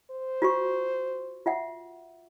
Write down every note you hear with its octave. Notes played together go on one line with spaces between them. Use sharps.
C5
F4 F#4 C#6
F4 E5 F#5